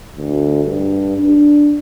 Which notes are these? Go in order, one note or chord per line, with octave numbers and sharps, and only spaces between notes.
D2
G2
D4